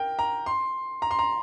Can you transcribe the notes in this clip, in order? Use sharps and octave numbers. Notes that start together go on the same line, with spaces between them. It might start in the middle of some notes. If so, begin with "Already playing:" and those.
Already playing: A#4 G5
A#5
C6
A#5
C6
A#5